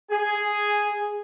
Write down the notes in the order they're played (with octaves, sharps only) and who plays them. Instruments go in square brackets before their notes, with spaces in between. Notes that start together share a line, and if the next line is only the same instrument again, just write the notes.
[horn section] G#4 G#5